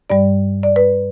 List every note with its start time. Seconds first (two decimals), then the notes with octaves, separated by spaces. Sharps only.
0.10 G2 G3 D5
0.63 D5
0.76 B4